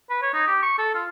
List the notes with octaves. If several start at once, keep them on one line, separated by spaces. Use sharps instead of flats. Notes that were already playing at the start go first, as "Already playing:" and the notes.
B4
C#5
D#4
G4
C#6
A4
F4